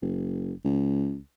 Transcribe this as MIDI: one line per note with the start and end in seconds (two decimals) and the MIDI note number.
0.02 0.53 30
0.65 1.18 37